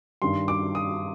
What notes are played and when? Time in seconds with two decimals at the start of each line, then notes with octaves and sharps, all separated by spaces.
0.22 G2 D#3 G3 C6
0.48 D6
0.75 D#6